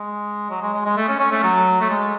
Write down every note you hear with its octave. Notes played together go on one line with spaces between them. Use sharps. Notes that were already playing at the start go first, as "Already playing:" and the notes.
Already playing: G#3
F#3
G#3
G#3
G#3
A3
C#4
C#4
A3
F#3
A3
G#3